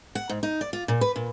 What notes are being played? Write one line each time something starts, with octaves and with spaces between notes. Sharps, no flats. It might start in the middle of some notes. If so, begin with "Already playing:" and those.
F#5
G#2
D#4
D5
F4
A#2
B4
A#2